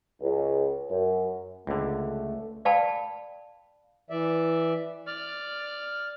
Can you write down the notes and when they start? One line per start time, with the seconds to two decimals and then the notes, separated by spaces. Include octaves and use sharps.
0.20 C#2
0.90 F#2
1.67 C#2 D3 A3
2.65 D5 F5 G5 A5 B5
4.10 E3 D5 E5
5.07 D5 F6